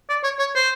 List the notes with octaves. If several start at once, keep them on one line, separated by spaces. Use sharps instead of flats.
D5
C#5
C#5
C5